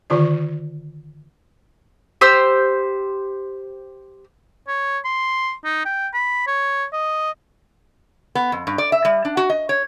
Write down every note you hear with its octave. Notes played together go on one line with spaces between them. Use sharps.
D3 D#3 F4 D5
G4 C5 C6 E6
C#5
C6
D#4
G5
B5
C#5
D#5
B3
F2
G2
D5
E5
G3
D4
F#4
D#5
C#5